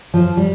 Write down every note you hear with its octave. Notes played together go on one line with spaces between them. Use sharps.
F3
G3